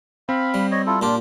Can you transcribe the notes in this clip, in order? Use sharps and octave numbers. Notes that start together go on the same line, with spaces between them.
C4 F5 B5
G3
C#5 D#5
E4 F4 A4
A#2 D4 F4 G4